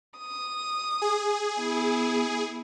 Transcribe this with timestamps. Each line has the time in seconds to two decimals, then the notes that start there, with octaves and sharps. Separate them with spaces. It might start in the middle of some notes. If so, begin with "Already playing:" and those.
0.18 D#6
1.02 G#4
1.58 B3 E4